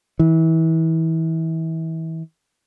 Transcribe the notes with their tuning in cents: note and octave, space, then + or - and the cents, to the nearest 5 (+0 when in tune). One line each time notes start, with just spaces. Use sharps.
E3 -30